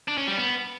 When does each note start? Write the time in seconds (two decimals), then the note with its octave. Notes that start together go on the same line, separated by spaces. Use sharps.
0.08 D4
0.18 C#4
0.27 G3
0.37 B3